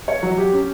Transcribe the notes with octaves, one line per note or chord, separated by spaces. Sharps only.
C#5
F#3
G4
C#4